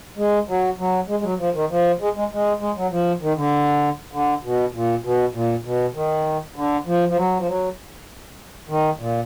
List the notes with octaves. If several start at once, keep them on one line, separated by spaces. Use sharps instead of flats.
G#3
F#3
F#3
G#3
G#3
F#3
F3
D#3
F3
G#3
G#3
G#3
G#3
F#3
F3
D#3
D3
D3
B2
A#2
B2
A#2
B2
D#3
D3
F3
F3
F#3
F3
F#3
D#3
A#2